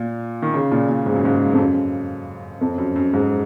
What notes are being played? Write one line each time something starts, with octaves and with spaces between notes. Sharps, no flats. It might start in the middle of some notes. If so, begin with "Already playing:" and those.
Already playing: A#2
D#3
C#3
A#2
A#2
G#2
F#2
G#2
F2
F#2
F2
F#2
F#2
G#2